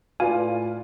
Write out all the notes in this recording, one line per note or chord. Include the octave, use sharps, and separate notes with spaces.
A2 F4 B4 D5 F5 G#5